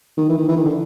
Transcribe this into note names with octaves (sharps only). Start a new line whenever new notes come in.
D#3
E3
D#3
E3
D#3
D3